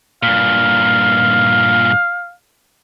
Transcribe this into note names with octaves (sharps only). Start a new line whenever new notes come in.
G2 A#2 F5